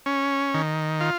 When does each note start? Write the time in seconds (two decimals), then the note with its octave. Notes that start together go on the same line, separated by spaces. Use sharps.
0.06 C#4
0.54 D#3
1.00 F4